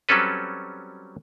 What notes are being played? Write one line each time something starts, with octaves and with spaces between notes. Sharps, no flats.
F#3 G3 C4 C#4 A4 B4